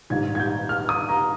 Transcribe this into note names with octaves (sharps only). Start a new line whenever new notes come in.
A#1 G#2 D#3 G3 G#6
G#6
G6
F6
D#6
A#5